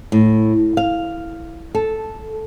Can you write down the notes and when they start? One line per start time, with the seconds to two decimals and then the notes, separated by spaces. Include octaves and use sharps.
0.12 A2
0.77 F5
1.75 A4